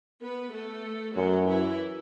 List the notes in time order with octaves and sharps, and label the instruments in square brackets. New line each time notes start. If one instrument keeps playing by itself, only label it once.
[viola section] B3 B4
A3 A4
[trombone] F#2 [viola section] F#3 F#4
[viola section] E3 E4